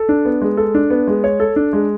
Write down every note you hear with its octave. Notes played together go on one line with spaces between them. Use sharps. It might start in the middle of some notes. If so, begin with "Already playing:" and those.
Already playing: A4
D4
B3
G#3
A4
D4
B3
G#3
C#5
A4
D4
G#3